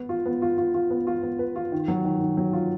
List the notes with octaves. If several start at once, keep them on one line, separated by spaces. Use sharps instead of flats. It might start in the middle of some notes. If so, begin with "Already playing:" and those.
Already playing: B3 B4
F4
B3
F4
F4
F4
B3
F4
B3
B4
F4
D#3
F#3
D#3
D#3
F#3
F4